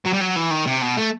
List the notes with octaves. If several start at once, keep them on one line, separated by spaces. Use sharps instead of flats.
F#3
G3
F#3
E3
D#3
C3
B2
A3